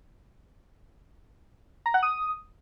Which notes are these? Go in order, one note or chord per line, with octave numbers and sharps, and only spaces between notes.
A#5
F#5
D#6